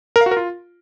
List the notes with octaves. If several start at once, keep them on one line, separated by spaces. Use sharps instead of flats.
A#4
F5
F#4
A#4
F4